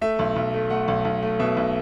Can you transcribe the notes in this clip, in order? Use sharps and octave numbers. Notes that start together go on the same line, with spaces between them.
A3 E5
B1
B1
A3
A3 F#5
B1
B1
A3
B2 E5
B1